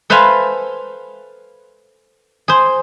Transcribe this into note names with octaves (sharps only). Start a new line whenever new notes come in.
A4 B4 C5 E5 F5 G#5
G#4 C5